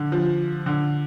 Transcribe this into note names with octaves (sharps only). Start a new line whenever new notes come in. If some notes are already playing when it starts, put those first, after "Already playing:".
Already playing: D3
F3
D3